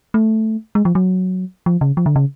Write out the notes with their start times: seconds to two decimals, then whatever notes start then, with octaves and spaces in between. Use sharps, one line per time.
0.14 A3
0.75 G#3
0.85 F3
0.95 F#3
1.66 F3
1.81 C#3
1.97 F3
2.06 D3
2.16 C#3